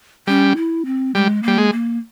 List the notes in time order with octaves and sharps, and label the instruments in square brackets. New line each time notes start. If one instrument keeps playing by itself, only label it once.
[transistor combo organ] G3 [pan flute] C#4
[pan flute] E4
C4
[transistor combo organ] G3 [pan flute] G#3
[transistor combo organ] G3 [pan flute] A#3
[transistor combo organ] G#3
[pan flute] A#3